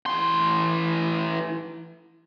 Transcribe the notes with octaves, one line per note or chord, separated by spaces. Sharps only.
E3 C6